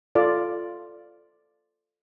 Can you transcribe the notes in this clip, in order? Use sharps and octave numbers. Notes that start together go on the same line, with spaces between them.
F4 A4 D5